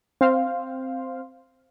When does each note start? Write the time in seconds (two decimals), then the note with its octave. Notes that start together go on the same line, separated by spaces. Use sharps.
0.21 C4 C5 F5